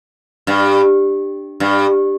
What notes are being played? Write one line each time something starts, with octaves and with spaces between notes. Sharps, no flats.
G2
G2